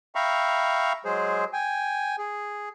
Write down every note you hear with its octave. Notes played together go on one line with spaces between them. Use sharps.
E5 F5 G5 A#5 B5 C#6
F#3 G#3 G#4 C5
G5 G#5
G#4